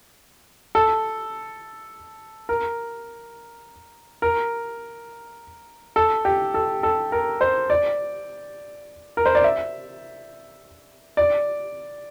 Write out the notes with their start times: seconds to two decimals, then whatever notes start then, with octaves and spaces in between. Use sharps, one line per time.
0.75 A4
2.49 A#4
4.22 A#4
5.96 A4
6.25 G4
6.54 A4
6.83 A4
7.12 A#4
7.41 C5
7.70 D5
9.17 A#4
9.26 C5
9.35 D5
9.44 E5
11.17 D5